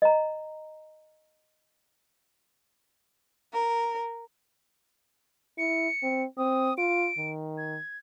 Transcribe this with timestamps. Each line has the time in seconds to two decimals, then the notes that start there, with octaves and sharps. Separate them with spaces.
0.02 D#5 A#5
3.53 A#4
5.58 E4 C#7
6.03 C4
6.38 C4 D#6
6.78 F4 D7
7.18 D#3
7.58 G#6